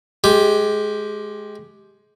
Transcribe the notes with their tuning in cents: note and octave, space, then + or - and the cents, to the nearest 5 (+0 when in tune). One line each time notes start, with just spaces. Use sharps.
G#3 +20 G4 +0